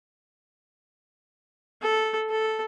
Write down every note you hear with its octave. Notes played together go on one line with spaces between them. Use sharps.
A4
A4